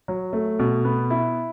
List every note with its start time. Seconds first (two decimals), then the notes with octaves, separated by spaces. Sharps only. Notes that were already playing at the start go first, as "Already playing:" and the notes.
0.08 F#3
0.33 A3
0.59 B2
0.85 B3
1.10 E4